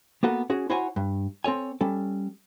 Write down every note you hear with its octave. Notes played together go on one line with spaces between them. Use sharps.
A#3 B3 F#4 A4
C#4 F#4 G#4
E4 F#4 C5 C#5 F#5 G#5
G2
C4 A4 C#5 G#5
G3 C#4 A4